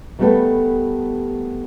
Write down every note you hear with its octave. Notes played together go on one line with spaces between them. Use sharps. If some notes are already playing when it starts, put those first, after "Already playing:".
D#3 G3 A3 B3 G4 A4